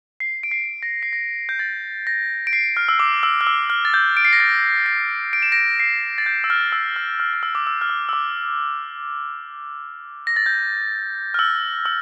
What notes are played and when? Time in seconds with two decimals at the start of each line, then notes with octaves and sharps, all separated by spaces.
0.20 C7
0.43 D7
0.51 C7
0.83 A#6
1.03 C7
1.13 A#6
1.49 G6
1.59 A6
2.07 A#6
2.47 D7
2.53 C7
2.77 F6
2.89 E6
3.00 D6
3.23 E6
3.41 F6
3.47 E6
3.70 F6
3.85 A6
3.94 G6
4.17 D7
4.25 C7
4.33 A#6
4.40 A6
4.86 C7
5.33 D7
5.42 E7
5.52 A#6 D7
5.80 C7
6.18 A6
6.26 G6
6.44 E6
6.50 F6
6.72 E6
6.96 F6
7.20 F6
7.33 F6
7.43 E6
7.55 D6
7.67 E6
7.81 F6
7.89 E6
8.09 E6
8.13 D6
10.27 A#6
10.36 A6
10.46 G6
11.34 F6
11.39 E6
11.86 E6